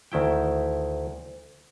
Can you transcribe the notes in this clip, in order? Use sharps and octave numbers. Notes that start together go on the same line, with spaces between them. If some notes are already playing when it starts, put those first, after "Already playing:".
D2 D#3 E4 G5